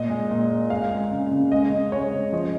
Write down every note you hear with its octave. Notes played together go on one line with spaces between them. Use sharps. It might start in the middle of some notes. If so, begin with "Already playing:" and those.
Already playing: A#2 D#5
G#3
A#2
A#2
G#3 F5
G#3
C#3
C#3
G#3 D#5
C#3
G#3 C#5
C#3
F3 D#5